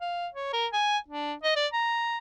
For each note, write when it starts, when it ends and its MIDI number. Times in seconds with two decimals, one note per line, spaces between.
0.01 0.27 77
0.34 0.50 73
0.53 0.67 70
0.73 0.98 80
1.08 1.34 62
1.43 1.55 75
1.56 1.67 74
1.73 2.18 82